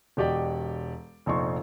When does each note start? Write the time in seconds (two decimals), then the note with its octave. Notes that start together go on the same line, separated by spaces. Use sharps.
0.17 E1 F#4 G4 D5 D#5 G5
1.26 F1 A#1 D#4 C6 C#6